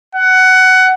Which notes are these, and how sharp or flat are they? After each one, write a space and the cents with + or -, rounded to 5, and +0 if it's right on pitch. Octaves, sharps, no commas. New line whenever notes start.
F#5 +15